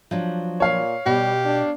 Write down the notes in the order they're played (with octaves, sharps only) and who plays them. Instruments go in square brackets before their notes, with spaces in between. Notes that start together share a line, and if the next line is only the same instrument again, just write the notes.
[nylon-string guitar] F3 F#3 D4
[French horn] A#2 [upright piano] C#5 F5
[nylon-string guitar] B2 [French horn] G3 [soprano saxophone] G4
[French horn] D4